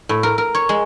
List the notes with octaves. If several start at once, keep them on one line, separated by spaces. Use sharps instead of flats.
A2
A#4
A#4
C#5
G#3